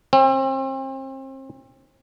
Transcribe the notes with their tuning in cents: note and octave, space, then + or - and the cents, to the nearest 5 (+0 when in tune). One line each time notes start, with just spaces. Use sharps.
C4 +35